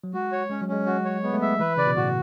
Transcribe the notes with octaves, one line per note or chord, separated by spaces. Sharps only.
F#3
G#3 F#4
C#5
G#3 C#4
F#3
G#3 C#4
G#3 F#4
C#5
G#3 B3
A3
G#3 E5
E3 B4
C#3 D5
B2
A2 F#4